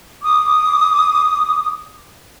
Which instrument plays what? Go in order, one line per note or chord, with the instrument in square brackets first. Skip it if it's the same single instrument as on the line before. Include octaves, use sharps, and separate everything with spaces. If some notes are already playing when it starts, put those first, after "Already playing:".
[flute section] D6 D#6